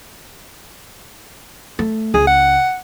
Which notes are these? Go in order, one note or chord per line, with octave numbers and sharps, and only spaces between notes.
A3
C#2 G#4
F#5